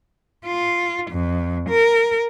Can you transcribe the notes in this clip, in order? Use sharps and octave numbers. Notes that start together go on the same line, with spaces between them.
F4
F2
A#4